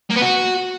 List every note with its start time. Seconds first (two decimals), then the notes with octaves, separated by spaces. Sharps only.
0.10 A#3
0.16 B3
0.22 F#4